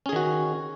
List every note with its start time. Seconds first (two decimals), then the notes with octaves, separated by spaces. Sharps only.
0.06 C#4
0.09 G#4
0.13 D#3
0.16 F#4